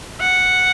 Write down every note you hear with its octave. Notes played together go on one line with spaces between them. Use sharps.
F#5